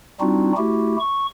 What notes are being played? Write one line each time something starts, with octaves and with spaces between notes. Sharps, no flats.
G3 C4 D4 D#4 F4 F#4
A3 E4 F#4 G4
C#6